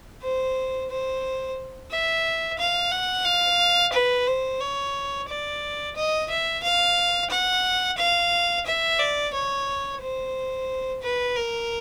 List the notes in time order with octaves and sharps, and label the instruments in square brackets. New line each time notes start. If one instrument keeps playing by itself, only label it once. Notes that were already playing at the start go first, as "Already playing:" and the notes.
[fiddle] C5
C5
E5
F5
F#5
F5
B4
C5
C#5
D5
D#5
E5
F5
F#5
F5
E5
D5
C#5
C5
B4
A#4